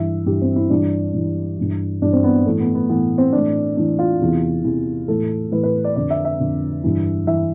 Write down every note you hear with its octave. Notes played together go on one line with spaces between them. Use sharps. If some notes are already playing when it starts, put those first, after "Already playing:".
Already playing: G2 E3 E5
G2 E3 G4
C4
E4
G2 E3 D4
G2 E3
G2 E3
G2 E3 D4
C4
B3
A2 E3 A3
B3
B3
A2 E3 B3
C4
A2 E3 D4
A2 E3 D4
F4
E2 C3 E3
E2 C3 E3
A2 E3 A4
A2 E3 B4
B4
D5
F2 D3 D5
E5
E5
F2 D3
G2 E3
E3 E5